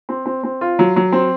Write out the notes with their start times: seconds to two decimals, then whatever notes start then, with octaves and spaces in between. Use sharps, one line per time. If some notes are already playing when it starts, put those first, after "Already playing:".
0.09 C4
0.26 C4
0.43 C4
0.61 F4
0.79 F#3
0.96 F#3
1.12 C4